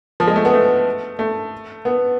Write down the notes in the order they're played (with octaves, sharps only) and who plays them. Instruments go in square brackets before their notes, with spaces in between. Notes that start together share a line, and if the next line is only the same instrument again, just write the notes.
[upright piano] F3
G#3
A3
B3
A3
A3
B3